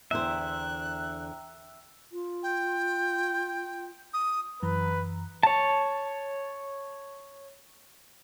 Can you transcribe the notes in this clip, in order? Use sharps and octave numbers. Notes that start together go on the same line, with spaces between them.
E2 D3 C5 E5 G5 A#5 F#6
F4
G5
D#6
F#2 E3 B4 A#5
C#5 A5